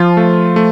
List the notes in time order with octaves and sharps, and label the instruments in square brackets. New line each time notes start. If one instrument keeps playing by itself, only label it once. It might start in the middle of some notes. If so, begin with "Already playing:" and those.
Already playing: [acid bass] F3 [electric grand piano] F4
[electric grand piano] A3
A3